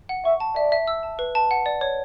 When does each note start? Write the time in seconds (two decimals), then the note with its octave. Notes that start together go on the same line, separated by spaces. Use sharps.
0.09 F#5
0.25 E5 C#6
0.40 A5
0.56 D5 E5
0.72 E5
0.87 E6
1.03 A5
1.19 B4
1.35 A5
1.51 F#5
1.66 D5
1.81 C#5